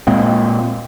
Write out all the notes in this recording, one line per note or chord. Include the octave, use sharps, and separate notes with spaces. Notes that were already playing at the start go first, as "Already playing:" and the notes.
A#2 G#3 A#3 C4